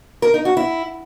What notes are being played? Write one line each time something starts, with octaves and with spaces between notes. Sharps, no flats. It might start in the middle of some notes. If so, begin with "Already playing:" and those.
A#4
D#4
F#4
E4